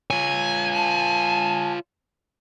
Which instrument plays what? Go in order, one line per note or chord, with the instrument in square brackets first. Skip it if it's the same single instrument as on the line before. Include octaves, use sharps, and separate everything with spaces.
[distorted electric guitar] F4 C#5 [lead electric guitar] G#5
[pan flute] A5